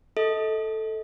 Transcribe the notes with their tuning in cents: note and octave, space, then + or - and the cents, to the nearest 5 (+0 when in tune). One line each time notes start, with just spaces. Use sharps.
A4 +0 D#5 +30